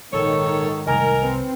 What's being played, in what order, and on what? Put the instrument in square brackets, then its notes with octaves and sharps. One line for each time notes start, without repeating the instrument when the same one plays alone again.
[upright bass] A#1 [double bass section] G#2 D#3 [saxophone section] A4 C#5
[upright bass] F1 C2 [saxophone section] A#4 [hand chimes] D#5 G#5 A#5
[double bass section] C4 [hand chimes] B4